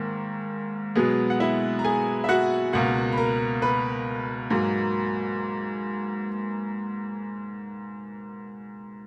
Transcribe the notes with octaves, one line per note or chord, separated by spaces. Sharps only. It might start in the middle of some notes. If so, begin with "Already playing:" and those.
Already playing: G#2 D#3 A#3
B2 F#3 G#3 B3 G#4
F#5
E4 E5
A#5
G#4 G#5
E5
F#4 F#5
C#2 B2 A#3 F#4 F#5
B5
A#4 A#5
B4 B5
G#2 F#3 A#3